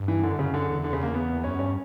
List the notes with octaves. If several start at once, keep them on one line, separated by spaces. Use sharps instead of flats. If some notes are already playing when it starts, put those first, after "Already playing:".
Already playing: G2
E3
F#2 D3
C#3
F#2 D3
E2
D3
C#3
A#3
B3
F#2 C#4
G2 C#4